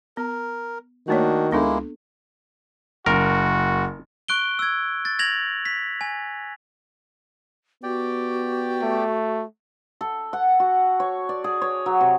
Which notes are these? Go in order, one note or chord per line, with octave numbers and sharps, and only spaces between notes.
B3 A#4
D#3 A3 A#3 D4 F#4 C#5
C#2 G#3 A#3 B3 D4 E4 A4
F#1 F#4 A#4
C#6 F#6 D7 G7
E6 G#6
A6
G#6 A#6 F7 F#7
B6
G#5
B3 F#4 G4 D5 G5
A3
A4
F#5
F#4
C#5
D5
G#4
C#5
F#3
C3